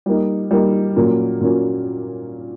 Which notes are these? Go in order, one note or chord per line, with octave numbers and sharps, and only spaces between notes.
G3 A#3 D#4
G3 A#3 D#4
A#2 F#3 A#3 C#4
A#2 F#3 A#3 C#4